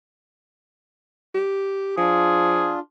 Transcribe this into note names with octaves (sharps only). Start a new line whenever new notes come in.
G4
F3 D4 F4 G#4